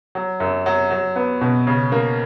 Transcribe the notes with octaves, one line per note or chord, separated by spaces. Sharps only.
F#3
F#2
F#3
F#3
B3
B2
C#3
A#3